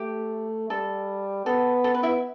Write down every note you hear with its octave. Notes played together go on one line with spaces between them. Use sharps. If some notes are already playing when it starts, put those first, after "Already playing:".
Already playing: A3 G4
G3 A4
B3 A4
A4
B4
E4 E5